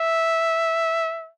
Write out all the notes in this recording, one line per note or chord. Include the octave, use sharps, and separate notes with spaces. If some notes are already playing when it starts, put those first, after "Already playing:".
Already playing: E5